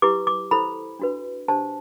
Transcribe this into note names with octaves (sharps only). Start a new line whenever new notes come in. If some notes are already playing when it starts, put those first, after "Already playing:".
E4 G4 B4 D6
D6
E4 A4 C5 B5
D4 F#4 B4
D4 G4 C5 A5